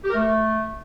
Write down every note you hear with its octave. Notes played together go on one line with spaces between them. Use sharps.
G4
A#4
A3